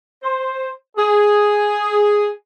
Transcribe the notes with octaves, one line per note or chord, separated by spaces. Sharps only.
C5
G#4